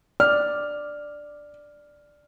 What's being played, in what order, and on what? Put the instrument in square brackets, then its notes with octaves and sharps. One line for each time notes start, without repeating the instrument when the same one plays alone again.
[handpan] D5 [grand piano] F6